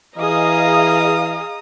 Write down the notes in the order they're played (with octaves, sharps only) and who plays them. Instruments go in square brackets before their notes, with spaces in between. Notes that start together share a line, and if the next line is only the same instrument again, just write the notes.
[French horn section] E3 [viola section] G#4 D#5 F5 [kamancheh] A#5 D#6